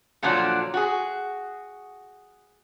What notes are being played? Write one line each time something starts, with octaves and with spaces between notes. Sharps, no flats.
A#2 D3 F3 F#3 D4
F#4 G#4